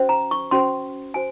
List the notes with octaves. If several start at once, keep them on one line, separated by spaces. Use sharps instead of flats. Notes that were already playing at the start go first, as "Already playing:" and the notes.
Already playing: C#4 F#4 C5
A#5
C#6
C#4 F#4 C5 C6
F#4 C5 G#5